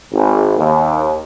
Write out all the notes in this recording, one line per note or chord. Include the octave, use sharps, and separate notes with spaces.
G#1
D#2